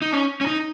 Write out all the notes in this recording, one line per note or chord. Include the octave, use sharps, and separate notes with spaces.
D#4
C#4
C#4
D#4